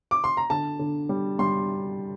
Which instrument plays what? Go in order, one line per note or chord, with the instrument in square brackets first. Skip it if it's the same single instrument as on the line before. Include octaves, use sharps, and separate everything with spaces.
[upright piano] D6
C6
A#5
D3 A5
D3
G3
G3 C6